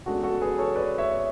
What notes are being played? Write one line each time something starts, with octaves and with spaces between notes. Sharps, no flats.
E2 C#3 G#3 D4 F#4 A4
F#4 A4
G#4 B4
A4 C#5
B4 D5
C#5 E5